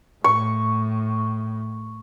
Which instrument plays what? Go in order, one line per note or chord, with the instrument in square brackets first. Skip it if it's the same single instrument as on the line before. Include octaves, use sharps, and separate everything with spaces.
[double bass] A2 [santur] C#6